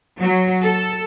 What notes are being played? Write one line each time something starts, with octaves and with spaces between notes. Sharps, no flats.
F#3
A4